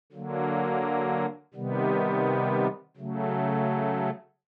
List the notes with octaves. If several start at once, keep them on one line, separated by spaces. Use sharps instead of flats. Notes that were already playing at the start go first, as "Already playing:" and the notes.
D3 F#3 A#3
C3 D#3 G3 B3
C#3 F#3 A3